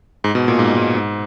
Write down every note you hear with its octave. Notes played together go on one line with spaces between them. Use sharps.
G#2
B2
A#2
G#2
G#2
G#2